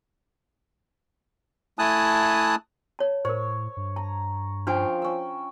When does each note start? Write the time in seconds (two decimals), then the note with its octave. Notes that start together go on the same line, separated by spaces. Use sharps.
1.79 A3 E4 G#5 A5 D#6 F#6
2.99 C#5 A5
3.25 A2 A#4 C5 C#5
3.77 G2
3.96 A5 A#5
4.67 F3 C#4 D4 F5 G5 A5 C#6 F6
5.02 C#4 E6